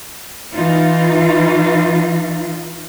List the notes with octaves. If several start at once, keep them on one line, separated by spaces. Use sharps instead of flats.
E3 D#4 F4